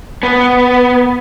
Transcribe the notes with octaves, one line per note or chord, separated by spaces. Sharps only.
B3